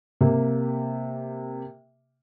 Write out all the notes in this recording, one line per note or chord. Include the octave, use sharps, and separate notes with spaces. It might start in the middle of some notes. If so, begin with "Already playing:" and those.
C3 A#3 G4